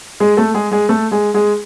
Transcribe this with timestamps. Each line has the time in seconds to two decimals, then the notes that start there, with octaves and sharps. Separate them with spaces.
0.20 G#3 G#4
0.37 A3 A4
0.54 G#3 G#4
0.71 G#3 G#4
0.89 A3 A4
1.11 G#3 G#4
1.34 G#3 G#4